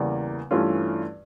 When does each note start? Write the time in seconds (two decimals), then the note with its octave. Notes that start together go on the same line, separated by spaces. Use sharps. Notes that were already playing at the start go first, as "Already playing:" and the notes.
Already playing: E2 C#3 E3 G3 A#3
0.51 G2 E3 A3 C#4 F4